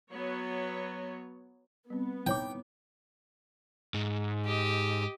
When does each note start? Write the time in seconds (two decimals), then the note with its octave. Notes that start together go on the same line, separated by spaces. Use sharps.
0.12 F#3 B3 C#5
1.90 G3 B3 C4
2.27 D#4 E4 C#5 G5 D6
3.94 G#2
4.45 G4 D#5